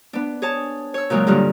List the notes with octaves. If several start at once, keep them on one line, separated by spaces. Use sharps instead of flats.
B3 D4
G#4 C#5 A5
C#5 E6
A#2 C#3 F#3 G#3 F4
G2 D3 G3 A#3 F4